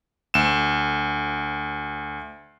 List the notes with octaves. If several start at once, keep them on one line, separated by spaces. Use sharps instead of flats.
D2 E7